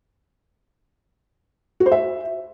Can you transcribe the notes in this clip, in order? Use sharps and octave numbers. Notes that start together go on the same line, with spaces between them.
F#4
C5
E5